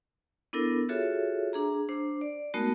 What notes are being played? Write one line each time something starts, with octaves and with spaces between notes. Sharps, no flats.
B3 D4 E4 A4 A#4
F4 F#4 G#4 A4 C#5 E5
D4 G#4 A#5
D4 C5
D5
G#3 A3 B3 D#4 F#4 A#4